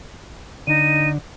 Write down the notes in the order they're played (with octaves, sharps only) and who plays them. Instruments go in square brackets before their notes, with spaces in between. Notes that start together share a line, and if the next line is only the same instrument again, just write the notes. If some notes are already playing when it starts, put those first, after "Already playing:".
[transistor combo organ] D3 [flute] D#4 [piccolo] D#7